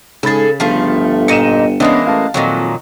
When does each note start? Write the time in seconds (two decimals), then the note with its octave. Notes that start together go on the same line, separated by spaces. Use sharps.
0.23 G#2 C#3 G#4 A4 B5 A6
0.60 G1 F3 A3 F5
1.28 A#2 D#4 C#7 D#7 E7
1.80 E3 G#3 A#3 B3 C#4 D4
2.07 A1 F5 A5
2.34 F2 A#2 D#3 F#3